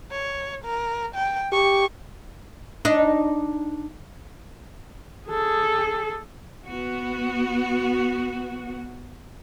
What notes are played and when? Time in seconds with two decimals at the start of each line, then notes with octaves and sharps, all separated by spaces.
0.11 C#5
0.64 A#4
1.15 G5
1.52 G4 C#6
2.85 D4 D#4
5.28 G#4 A4
6.65 B3 F#4